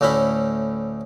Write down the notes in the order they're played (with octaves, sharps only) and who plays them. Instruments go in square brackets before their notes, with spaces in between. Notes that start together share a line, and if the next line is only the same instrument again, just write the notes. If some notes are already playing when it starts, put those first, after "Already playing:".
[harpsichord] D2 A2 C#4 E4 B5